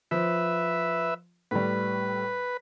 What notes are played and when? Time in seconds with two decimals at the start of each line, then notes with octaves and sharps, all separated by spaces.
0.11 F3 B4 E5
1.51 A2 G3 B4